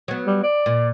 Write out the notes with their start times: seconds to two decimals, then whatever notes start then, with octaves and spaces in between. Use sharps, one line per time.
0.08 F#3 B3
0.27 G3
0.43 D5
0.66 A#2